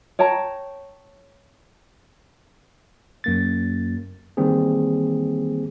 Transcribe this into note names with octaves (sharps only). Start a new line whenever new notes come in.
C#5 G5 A5 A#5
F#2 A#3 A6
D#3 E3 G3 A#3 C4 G#4